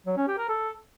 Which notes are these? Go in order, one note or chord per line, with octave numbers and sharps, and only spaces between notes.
F#3
C#4
G4
A#4
A4